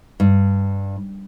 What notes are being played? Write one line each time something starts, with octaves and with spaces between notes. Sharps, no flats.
G2